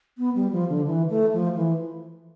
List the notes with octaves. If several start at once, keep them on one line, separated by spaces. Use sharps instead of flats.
B3
G3
F3
D3
E3
A3
F3
E3